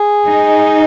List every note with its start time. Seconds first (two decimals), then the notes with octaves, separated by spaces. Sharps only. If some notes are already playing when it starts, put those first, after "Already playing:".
Already playing: G#4
0.28 D#4